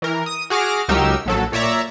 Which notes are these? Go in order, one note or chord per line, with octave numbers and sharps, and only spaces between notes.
E3 A#4
D#6 D#7
F#4 G#4 D6 F6 A#6
C#2 F#3 D#4 G4 A#4 E6
A#1 F#3 A4
A#2 C#5 D5 E5 A#5